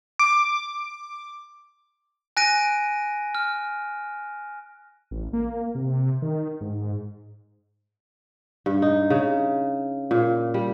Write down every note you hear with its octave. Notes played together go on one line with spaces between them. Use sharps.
D6
G#5 F#6 A#6 D7 D#7
F6
A1
A#3
C3
D#3
G#2
G2
D#4
C#3
A#2
G3